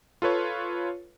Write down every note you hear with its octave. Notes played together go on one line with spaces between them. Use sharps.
F4 A4 B4 C#5